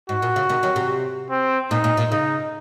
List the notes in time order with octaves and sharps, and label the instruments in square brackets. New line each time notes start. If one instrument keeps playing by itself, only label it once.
[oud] G#2 [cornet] F#4
[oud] A#2
C#3
C3 D#3
D#3 F#3
C3
[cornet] C4
[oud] A#2 [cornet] D#4
[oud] A#2
A#2
[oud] C#3 [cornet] D#4